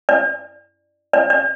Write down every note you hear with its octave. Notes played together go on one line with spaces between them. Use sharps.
D5
D5
D5